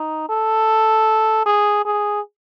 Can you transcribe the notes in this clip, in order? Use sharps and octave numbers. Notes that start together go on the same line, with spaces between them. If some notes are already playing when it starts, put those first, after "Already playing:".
Already playing: D#4
A4
G#4
G#4